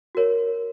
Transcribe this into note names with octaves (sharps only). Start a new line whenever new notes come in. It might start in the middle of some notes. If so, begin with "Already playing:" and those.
F#4 A#4 C#5